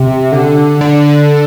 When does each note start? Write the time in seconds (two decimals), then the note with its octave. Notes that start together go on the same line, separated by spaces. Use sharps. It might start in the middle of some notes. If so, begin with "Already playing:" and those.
Already playing: C3
0.32 D3
0.81 D3